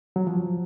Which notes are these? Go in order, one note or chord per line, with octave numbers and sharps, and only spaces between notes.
F#3
F3